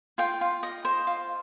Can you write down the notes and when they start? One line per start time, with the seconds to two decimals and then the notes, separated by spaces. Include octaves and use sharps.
0.18 F4 G5
0.41 F4
0.63 D#5
0.85 C5
1.07 F4